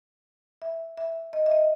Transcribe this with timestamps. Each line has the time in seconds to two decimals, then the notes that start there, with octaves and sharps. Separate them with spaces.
0.62 E5
0.97 E5
1.33 D#5
1.46 E5
1.51 D#5